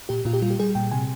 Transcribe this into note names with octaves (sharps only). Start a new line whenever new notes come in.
A#2 G4
A#2 F4
G4
G3 F4
G4
G3 G#4
A#2 G5
C3 G#5